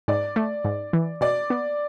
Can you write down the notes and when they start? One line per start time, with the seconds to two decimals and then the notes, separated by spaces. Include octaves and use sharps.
0.08 G#2 D5
0.36 A3
0.65 G#2
0.93 E3
1.21 B2 D5
1.50 B3